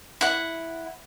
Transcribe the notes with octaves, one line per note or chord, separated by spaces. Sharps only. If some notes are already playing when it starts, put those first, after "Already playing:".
E4 F#5